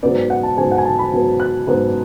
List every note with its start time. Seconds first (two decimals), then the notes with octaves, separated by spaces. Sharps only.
0.03 G#2 F#3 B3 D5
0.30 F#5
0.43 A5
0.57 G#2 F#3 B3 G#5
0.71 F#5
0.78 G#5
0.85 A5
0.99 B5
1.12 G#2 F#3 B3
1.40 F#6
1.67 G#2 F#3 B3